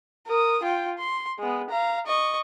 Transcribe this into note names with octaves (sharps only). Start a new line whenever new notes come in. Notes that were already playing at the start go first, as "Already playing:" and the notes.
A#4 D#6
F4 G5
C6
G#3 B3
F5 A#5
D#5 C#6